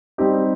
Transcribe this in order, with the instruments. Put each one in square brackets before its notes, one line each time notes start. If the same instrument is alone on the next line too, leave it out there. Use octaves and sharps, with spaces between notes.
[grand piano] G3 C4 D#4 G4